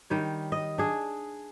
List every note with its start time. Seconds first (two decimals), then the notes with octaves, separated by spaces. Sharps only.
0.10 D#3 G3 C#5
0.52 D#5
0.78 D4 G#4